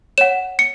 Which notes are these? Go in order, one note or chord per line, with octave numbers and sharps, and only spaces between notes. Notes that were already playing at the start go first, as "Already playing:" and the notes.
C#5 F#5 E7
C#7